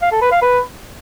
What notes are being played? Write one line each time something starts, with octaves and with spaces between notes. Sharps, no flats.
F5
A4
B4
F5
B4